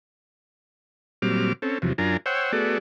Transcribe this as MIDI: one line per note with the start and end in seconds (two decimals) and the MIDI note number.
1.22 1.53 46
1.22 1.53 54
1.22 1.53 55
1.22 1.53 60
1.22 1.53 86
1.22 1.53 89
1.62 1.78 60
1.62 1.78 61
1.62 1.78 69
1.82 1.93 40
1.82 1.93 48
1.82 1.93 53
1.82 1.93 54
1.98 2.17 42
1.98 2.17 62
1.98 2.17 65
1.98 2.17 70
1.98 2.17 80
1.98 2.17 82
2.26 2.52 72
2.26 2.52 73
2.26 2.52 78
2.26 2.52 79
2.26 2.52 88
2.52 2.78 57
2.52 2.78 59
2.52 2.78 66
2.52 2.78 68
2.52 2.78 69
2.52 2.78 74